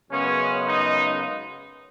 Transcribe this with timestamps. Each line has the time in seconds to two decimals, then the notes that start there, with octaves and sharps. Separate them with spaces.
0.10 F#2 C#3 G#3 B3 C#4
0.67 D#4